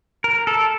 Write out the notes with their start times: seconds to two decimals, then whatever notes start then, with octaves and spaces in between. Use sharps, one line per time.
0.24 A#4
0.47 A4